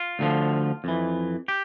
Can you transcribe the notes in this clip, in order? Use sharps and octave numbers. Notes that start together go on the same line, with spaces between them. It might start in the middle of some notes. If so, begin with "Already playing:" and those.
Already playing: F4
D2 D3 F3
F2 E3
G4